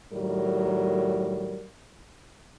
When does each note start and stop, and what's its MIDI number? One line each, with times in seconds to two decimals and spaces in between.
0.12 1.64 45
0.12 1.64 51
0.12 1.64 54
0.12 1.64 55
0.12 1.64 70